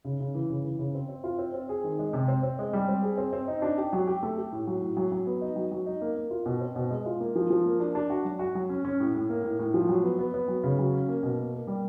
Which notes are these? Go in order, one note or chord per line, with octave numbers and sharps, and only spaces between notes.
C#3
C#3
E3
C#3
E3
C#3
C4
C4
F4
C4
C4
G#4
D#3
G#3
C3
C4
C4
G#3
G3
C4
G#4
C4
C4
D#4
D4
G4
F#3
G4
A3
G4
A2
F#3
A2
F#3
F#3
B3
D#4
F#3
F#3
D#4
A#3
A#3
F4
B2
C4
B2
G#3
F4
A#3
F3
F3
A#3
D4
D4
F#4
F#3
F#4
F#3
C#4
C#4
A2
A2
A#3
A2
A2
F3
F#3
B3
B3
B3
F#3
C#3
F#3
C#4
A#3
B2
A#3
A#3
G3